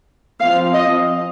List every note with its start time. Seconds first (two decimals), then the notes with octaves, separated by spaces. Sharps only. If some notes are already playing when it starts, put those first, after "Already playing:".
0.41 F3 C4 F5
0.74 D#5